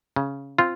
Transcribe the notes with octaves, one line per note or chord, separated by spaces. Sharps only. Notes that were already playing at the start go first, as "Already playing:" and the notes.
C#3
C4 F4